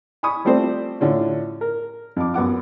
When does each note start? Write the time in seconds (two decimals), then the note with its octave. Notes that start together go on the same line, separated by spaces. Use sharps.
0.23 G#5 B5 C#6 D#6
0.45 G3 A3 C4 F4 C5 D5
1.00 A2 D3 C#4 F4
1.61 A#4
2.16 F2 D6
2.34 F#2 B3 F#5 D6